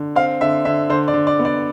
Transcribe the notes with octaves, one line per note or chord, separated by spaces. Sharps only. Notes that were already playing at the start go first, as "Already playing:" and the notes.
Already playing: D3
C4 F5
D3 E5
D3 E5
D3 C5
D5
D3
D5
B3
D5